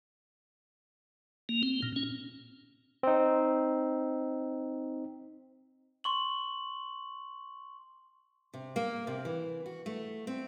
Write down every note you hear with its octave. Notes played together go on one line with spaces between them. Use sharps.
A#3
C4
A#2
C#4
C4 D#4
C6 C#6 F#7
C3
A#3
C3
E3
F#4
A3
C4